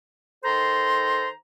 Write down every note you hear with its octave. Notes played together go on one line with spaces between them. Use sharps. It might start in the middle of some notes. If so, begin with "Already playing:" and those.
D#3 A4 C5 A#5 C6